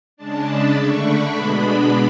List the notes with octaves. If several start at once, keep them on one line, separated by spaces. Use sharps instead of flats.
C#3 G#3 D4 A5
B5
D3 A3 D4 C#6
B5
B2 G#3 B3 D4 B5